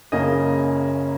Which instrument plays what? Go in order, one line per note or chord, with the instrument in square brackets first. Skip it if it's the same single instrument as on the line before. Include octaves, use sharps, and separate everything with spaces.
[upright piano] F#1 F#2 C#3 A#3 C#4 D#5